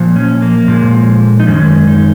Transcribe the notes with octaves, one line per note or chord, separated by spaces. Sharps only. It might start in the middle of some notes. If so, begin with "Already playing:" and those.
Already playing: A#2 F3
C#4
A#3
A#2 F3 G#3
D#4
F#2 D#3 G#3 C#4
D#4